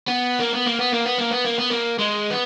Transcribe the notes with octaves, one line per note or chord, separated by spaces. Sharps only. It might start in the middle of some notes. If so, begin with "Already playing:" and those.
B3
A#3
B3
A#3
B3
A#3
B3
A#3
B3
A#3
B3
A#3
G#3
B3